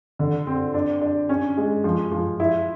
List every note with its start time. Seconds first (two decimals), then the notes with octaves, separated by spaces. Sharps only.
0.19 D3
0.47 C4
0.74 D4
1.01 D4
1.29 C#4
1.57 G#3
1.84 F3
2.12 F3
2.40 E4